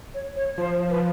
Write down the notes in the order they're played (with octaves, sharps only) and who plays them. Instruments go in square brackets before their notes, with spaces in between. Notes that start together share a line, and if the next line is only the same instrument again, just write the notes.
[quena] C#5
C#5
[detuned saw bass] F3 [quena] C5
[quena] B4